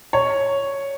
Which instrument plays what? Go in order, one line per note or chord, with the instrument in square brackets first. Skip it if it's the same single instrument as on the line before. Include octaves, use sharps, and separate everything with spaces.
[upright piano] C#5